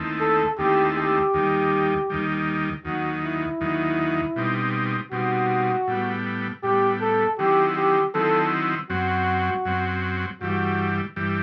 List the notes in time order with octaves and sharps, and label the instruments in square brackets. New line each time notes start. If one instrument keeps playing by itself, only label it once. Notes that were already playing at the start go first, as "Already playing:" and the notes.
Already playing: [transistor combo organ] D#2 D#3 A3 C4 E4
[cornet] A4
[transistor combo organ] D#2 D#3 A3 C4 E4 [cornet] G4
[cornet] G4
[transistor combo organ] D#2 D#3 G3
D#2 D#3 G3
[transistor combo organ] D#2 D#3 F#3 [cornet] F#4
[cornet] E4
[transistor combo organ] D#2 D#3 F#3
B2 G3 C4 D#4
[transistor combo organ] B2 G3 C4 D#4 [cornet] F#4
[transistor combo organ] A2 G3 B3
[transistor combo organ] A2 G3 B3 [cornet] G4
[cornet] A4
[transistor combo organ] D#3 F#3 C4 E4 [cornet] G4
[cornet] G4
[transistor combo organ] D#3 F#3 C4 E4 [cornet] A4
[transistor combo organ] F#2 F#3 C4 [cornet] F#4
[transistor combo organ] F#2 F#3 C4
[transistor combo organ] G2 E3 G3 [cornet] F#4
[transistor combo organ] G2 E3 G3